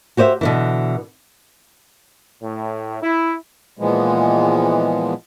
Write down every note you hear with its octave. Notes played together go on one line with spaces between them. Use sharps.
F#4 G4 C5 D5 E5
B2 D3 E3
A2
E4
A#2 E3 F3 G#3 B3